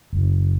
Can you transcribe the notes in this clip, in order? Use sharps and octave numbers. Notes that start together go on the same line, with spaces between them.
F#1